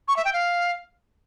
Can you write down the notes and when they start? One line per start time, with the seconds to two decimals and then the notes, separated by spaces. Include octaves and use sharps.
0.08 C#6
0.17 E5
0.25 G5
0.33 F5